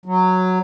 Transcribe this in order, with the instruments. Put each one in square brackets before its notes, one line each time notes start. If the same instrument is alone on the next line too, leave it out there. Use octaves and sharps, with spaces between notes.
[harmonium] F#3